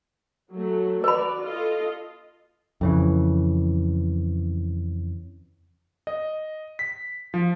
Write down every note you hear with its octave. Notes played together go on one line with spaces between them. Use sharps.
F#3 A3
F#4 B4 D5 B5
F4 A4 D#5
F2 C#3 E3
D#5
B6
F3